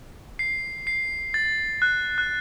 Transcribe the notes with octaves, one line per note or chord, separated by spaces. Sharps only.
C7
C7
A6
F#6
F#6